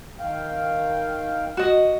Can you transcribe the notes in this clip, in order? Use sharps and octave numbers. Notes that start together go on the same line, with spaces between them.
D#3 F5 G5
F#4 D#5